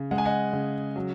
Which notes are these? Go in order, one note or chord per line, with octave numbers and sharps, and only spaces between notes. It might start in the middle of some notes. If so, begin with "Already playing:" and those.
Already playing: C#3
G#3 F#5
G#5
D#5 F#5
C#3
F#3